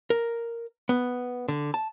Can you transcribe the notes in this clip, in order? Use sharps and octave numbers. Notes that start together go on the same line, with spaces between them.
A#4
B3
D3
A5